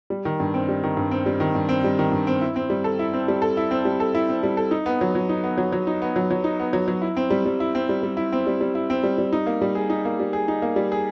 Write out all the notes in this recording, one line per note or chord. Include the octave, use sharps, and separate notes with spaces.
G3
D#3
G2
C4
G3
D#3
G2
C4
G3
D#3
G2
C4
G3
D#3
G2
C4
E4
C4
G3
A4
E4
C4
G3
A4
E4
C4
G3
A4
E4
C4
G3
A4
D#4
B3
F#3
F#3
D#4
B3
F#3
F#3
D#4
B3
F#3
F#3
D#4
B3
F#3
F#3
E4
C4
G3
G3
E4
C4
G3
G3
E4
C4
G3
G3
E4
C4
G3
G3
D#4
A#3
G3
G#4
D#4
A#3
G3
G#4
D#4
A#3
G3
G#4